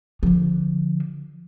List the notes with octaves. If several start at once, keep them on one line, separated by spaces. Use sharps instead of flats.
D3 F3